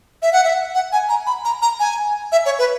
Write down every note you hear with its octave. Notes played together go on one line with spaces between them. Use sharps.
E5
F#5
E5
F#5
G#5
A#5
B5
A#5
A#5
G#5
E5
C#5
B4